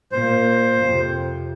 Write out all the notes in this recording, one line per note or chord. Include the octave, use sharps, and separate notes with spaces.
A#2 A#3 C5
F2 C3